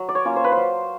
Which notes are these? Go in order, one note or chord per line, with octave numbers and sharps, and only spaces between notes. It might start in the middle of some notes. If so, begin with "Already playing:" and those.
Already playing: F#3
D5
C#5
A#3 C#4 F4
C5
B4
F#3 C5